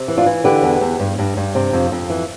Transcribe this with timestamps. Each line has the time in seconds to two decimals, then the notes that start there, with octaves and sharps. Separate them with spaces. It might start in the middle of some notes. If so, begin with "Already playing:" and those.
Already playing: C3
0.08 E3
0.17 D4 F4
0.26 E3
0.44 D3 G4 B4
0.63 E2
0.81 E2
1.00 G2
1.19 G2
1.37 G2
1.55 C3
1.73 F2
1.92 F2
2.10 E3